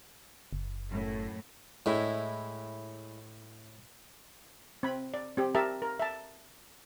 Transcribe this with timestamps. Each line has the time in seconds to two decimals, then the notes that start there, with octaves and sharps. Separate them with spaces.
0.53 F#1
0.89 F#2 A2
1.86 A2 G#3 E4
4.83 C4 B5
5.14 D5
5.37 C4 G4
5.55 G4 A#4 E5 A5
5.82 A#4
5.99 E5 A5